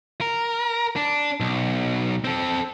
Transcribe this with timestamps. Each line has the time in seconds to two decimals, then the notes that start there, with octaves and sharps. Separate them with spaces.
0.21 A#4
0.96 D4
1.40 B1
2.25 C4 A4